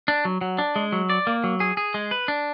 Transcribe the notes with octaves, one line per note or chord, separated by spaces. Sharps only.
D4
F#3
F#3
D4
G#3
F#3
D5
A#3
F#3
G#4
G#4
G#3
B4
D4